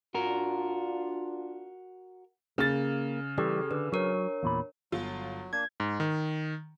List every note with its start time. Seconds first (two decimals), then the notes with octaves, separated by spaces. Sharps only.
0.14 D4 F4 F#4 A#4
2.58 C#3 A#3 A6
3.38 E3 G3 C#4 G4 A4
3.71 D3 B4
3.92 F#3 D4 A#4 C#5
4.43 E2 A#2 B5
4.92 G1 F#3 F4
5.53 A#3 D4 G#6
5.80 G#2
6.00 D#3